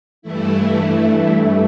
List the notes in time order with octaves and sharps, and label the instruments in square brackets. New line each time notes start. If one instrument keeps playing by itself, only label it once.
[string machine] G2 E3 A3 E4